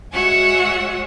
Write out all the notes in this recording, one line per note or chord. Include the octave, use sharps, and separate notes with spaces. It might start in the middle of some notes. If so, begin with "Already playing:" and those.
G#3 F#4 C#5 E5 F#5 G#5